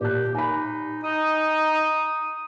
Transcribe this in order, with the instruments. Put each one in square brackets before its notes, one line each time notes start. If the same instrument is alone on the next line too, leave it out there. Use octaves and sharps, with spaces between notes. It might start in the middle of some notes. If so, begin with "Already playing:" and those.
[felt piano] A#2 F#6 [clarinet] G4
[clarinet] D#4 [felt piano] G#5 B5
[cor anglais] D#4 [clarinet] D#6